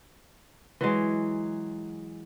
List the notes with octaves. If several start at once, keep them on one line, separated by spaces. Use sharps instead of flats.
E3 F#3 G#3